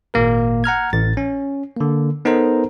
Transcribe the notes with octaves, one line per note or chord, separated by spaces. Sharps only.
G#1 A#2 A#3 A#4
F#5 A#5 F6 G#6
A1 A6
C#4
D3 A#3
B3 D#4 A4 A#4 C5 A#5